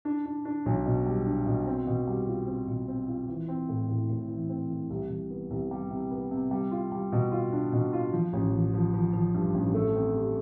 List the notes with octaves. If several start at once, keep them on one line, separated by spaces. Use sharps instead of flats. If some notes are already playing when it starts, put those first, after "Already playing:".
D4
D4
D4
B1
B2
G3
D4
B2
C4
B2
G3
F4
C4
B2
C4
F4
E3
C4
A2
A2
A2
E3
C4
E3
C2
C2
B3
C2
G3
C3
B3
C3
G3
F4
G3
B2
F4
D4
B2
F4
F3
A1
F3
F3
F3
F3
G2
A1
A3
C4
G4